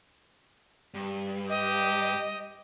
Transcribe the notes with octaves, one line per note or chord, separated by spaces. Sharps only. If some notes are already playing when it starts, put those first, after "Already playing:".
G2
G4 D#5